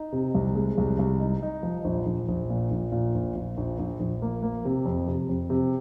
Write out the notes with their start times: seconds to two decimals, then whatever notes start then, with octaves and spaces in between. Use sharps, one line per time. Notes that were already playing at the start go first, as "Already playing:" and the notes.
Already playing: D#4
0.12 C3
0.35 C2
0.55 G#3
0.78 C2
0.99 C2
1.20 D#4
1.43 D#4
1.63 F3
1.84 A#1
2.06 A#1
2.28 A#1
2.50 A#2
2.71 A#1
2.92 A#2
3.14 A#1
3.36 A#2
3.57 A#1
3.79 A#1
4.00 A#1
4.22 A#3
4.43 A#3
4.65 C3
4.85 F2
5.08 C3
5.29 F2
5.50 C3